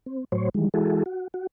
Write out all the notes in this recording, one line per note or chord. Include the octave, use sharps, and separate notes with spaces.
C4
A2 F#3 C5 C#5
D#3 E3 G3 G#3
E3 G#3 E4 F#4 G#4 A4
F#4
F#4